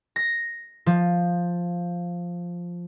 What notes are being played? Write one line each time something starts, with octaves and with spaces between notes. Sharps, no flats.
A#6
F3